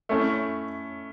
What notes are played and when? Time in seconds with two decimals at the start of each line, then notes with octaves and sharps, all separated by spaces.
0.09 A3 C#4 E4